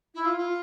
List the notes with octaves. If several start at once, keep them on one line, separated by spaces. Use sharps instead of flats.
E4
F4
F4